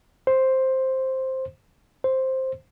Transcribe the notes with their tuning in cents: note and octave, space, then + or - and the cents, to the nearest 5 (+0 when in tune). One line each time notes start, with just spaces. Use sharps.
C5 +5
C5 +5